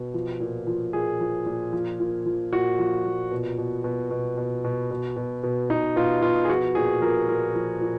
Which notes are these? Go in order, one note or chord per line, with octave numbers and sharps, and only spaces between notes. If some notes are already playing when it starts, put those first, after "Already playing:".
Already playing: B2
F3
A#2
F3
A#2 G#4
F3
A#2
F3
A#2
F3
A#2 F#4
F3
A#2
B2
B2
B2
B2
B2
B2
B2
B2
B2
B2 D#4
B2 F4
B2 F4
G#4
F3 F#4
A#2 G#4
F3 A#4
A#2 A#4
F3
A#2